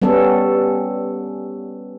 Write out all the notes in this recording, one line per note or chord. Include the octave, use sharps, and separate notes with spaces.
G3 B3 C#4 A4